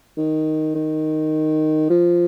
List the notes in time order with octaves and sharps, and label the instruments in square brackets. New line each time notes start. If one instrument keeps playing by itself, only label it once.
[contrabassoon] D#3
D#3
F3